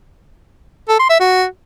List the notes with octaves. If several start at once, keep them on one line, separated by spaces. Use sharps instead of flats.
A4
C6
E5
F#4